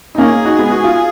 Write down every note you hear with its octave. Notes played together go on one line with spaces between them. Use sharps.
D#4
A#3 C#4 G#4
D#4 F#4
G#3 B3
F#4
F4